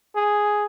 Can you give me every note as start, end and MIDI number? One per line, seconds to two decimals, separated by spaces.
0.16 0.65 68